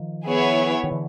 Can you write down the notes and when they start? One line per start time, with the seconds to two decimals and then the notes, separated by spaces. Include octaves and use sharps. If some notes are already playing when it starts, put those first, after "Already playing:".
Already playing: D#3 F3
0.26 B3 E4 G#4 C#5
0.84 D#3
0.91 D3 E3